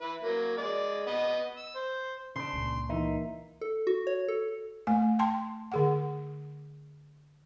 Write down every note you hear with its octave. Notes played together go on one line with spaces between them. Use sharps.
E4 B4
F#3 A#3
G#3 D5
B3 D#5
E6
C5
C#3 D4 C6
C#2 A#2
E3 A#3 D#4 E5
A4
F#4
C#5
A4
A3 G#5
G5 A5 C6
D3 G#4 F#5